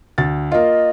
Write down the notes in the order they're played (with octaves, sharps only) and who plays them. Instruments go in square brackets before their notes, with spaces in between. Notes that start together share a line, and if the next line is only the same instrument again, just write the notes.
[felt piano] D2 A6
[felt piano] A#3 F4 [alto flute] D#5